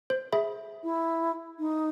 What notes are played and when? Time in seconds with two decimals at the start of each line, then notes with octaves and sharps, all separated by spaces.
0.10 C5
0.33 G#4 E5 B5
0.84 E4
1.59 D#4